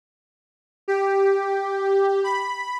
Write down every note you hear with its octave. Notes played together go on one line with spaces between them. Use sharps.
G4
B5